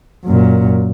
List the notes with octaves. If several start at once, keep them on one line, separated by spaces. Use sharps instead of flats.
F#2 A#2